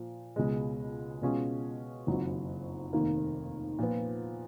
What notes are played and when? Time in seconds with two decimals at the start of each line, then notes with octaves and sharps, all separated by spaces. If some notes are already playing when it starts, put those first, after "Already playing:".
Already playing: A#2 F3
0.36 C#2 B2 G#3
1.22 B2 G#3 C#4 F4 G#4
2.07 F#1 F2 D#3 F#3
2.93 F1 D#2 D#3 A#3
3.79 A#2 F3 B3